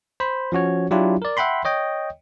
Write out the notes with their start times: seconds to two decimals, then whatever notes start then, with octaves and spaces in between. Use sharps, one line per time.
0.20 C5 B5
0.52 F3 C#4 F#4 C#5
0.91 F#3 D4 E4 F4 G4
1.22 A#4 D5
1.37 E5 F#5 G5 B5 C6
1.65 C#5 D#5 G5